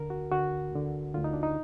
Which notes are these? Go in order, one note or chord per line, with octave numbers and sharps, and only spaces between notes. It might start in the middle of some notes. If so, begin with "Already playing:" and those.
Already playing: D2 D3 A#4
F#4
D2 D3 F#4
D2 D3
D2 D3 F4
D#4
D4
D#4